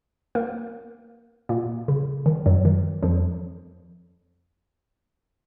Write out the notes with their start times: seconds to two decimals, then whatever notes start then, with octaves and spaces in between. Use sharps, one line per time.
0.35 A#3 A#4
1.49 A#2 A#3
1.88 C#3
2.26 D#3
2.46 F#2 F#3
2.65 D#3
3.03 F2 F3